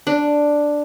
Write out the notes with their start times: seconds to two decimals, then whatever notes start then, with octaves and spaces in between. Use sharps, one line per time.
0.07 D4